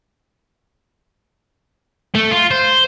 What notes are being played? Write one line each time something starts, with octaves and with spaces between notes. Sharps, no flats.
A3
F4
C5